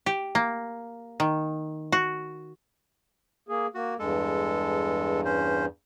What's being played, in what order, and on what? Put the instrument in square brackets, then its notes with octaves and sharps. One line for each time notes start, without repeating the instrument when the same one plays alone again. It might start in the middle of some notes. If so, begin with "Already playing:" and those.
[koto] G4
A#3
D#3
F#4
[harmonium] A#3 G#4
[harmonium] A#3 [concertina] F#4
[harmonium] E2 G2 [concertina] G#3 A4
[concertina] C#4 C5